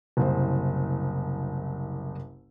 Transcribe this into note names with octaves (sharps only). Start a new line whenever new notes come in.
F#1 C2 C5